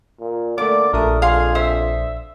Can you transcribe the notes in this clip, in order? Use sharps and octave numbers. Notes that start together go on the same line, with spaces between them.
A#2
D3 A3 A#3 D5 D6
A#1 A3 D4 A#4 D#6
F2 G#4 F5 C6
C5 E5